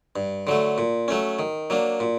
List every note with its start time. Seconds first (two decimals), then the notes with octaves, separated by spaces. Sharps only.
0.16 G2
0.47 D3 F#3 A3
0.78 A#2
1.08 F#3 A3 C#4
1.39 D#3
1.70 F#3 A#3 D4
2.00 A#2